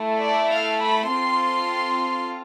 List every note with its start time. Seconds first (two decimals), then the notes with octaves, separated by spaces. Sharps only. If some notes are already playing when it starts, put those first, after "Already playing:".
Already playing: A3 E4 A4
0.21 D5
0.52 F5
0.81 B5
1.11 C4 F4 A4 C6